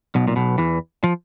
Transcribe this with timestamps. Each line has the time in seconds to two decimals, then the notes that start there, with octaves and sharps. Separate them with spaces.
0.15 B1 B2
0.28 A#2
0.36 B1 B2
0.58 E2 E3
1.04 F3